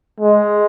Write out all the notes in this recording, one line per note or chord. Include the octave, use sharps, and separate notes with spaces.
G#3